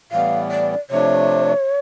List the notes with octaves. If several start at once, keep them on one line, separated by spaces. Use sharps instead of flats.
A2 E3 G3 B3 F5
D5
C3 F3 A3 D4 C#5